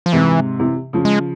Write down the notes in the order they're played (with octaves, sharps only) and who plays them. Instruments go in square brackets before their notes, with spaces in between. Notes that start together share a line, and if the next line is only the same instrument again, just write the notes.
[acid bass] F3
[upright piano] G#2 C3 [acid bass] E3
[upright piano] C3 E3
C#3 F3
[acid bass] G#3